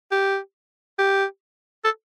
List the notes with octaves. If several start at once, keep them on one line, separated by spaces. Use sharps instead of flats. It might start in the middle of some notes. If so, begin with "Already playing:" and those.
G4
G4
A4